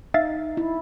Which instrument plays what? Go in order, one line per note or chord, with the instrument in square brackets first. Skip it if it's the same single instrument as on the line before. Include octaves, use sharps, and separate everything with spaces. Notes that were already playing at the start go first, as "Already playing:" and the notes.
[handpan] D#4 [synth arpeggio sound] E5 F5 A6
[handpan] E4